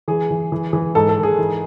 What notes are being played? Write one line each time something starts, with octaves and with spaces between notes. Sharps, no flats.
E3 G#4
E3
E3
E3
G#2 A4
A4
D#3
G#4
E3